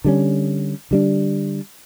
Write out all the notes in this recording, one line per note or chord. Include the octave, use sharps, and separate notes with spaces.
D3 G3 C#4
D3 G3 D4